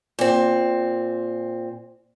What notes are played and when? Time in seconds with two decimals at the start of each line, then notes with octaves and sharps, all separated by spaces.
0.19 A#2 C4